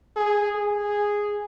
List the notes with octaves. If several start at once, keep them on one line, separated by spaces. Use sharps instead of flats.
G#4
G#4